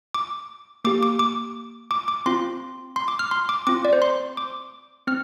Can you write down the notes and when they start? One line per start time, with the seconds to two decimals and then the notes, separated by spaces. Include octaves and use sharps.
0.14 D6
0.85 A#3 G4 D6
1.03 D6
1.19 D6
1.91 D6
2.08 D6
2.26 C4 F4 C6
2.96 C6
3.08 D6
3.19 F6
3.31 C6
3.49 D6
3.67 C4 F4 D6
3.85 D5
3.93 C5
4.02 C6
4.37 D6
5.07 C4 F6